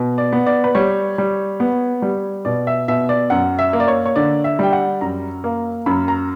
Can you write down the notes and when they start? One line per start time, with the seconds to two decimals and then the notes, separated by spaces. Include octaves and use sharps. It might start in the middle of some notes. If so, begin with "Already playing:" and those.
Already playing: B2
0.18 D5
0.33 B3
0.47 D5
0.64 B4
0.75 G3 C#5
1.18 G3
1.60 B3
2.02 G3
2.45 B2 D5
2.67 E5
2.88 B2 E5
3.09 D5
3.30 F#2 F#5
3.59 E5
3.73 A#3
3.80 D5
3.88 C#5
4.06 C#5
4.16 D3 D5
4.44 E5
4.59 G3 G5
4.73 F#5
5.01 F#2 A#5
5.44 A#3
5.86 F#2 B5
6.08 A#5